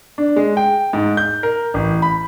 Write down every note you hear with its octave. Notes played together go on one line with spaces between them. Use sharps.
D4
G#3
G5
G#2
G6
A#4
A1
B5